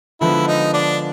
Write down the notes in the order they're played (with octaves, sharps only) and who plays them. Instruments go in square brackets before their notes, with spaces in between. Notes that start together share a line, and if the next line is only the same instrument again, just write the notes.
[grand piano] D3 F3 G#3 B3 [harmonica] E4
[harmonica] D#4
D4